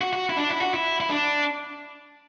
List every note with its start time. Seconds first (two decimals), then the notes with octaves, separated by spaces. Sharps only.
0.01 F#4
0.13 F#4
0.29 E4
0.37 D4
0.49 E4
0.61 F#4
0.74 E4
1.00 E4
1.10 D4